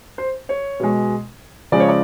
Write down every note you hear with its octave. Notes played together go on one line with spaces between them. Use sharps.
C5
C#5
B2 G#3
C#3 F3 G#3 D5
C#5
D5